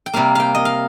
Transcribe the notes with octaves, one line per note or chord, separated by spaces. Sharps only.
G5
C3 G3 A#3 F5
F5 G5
D#5
F5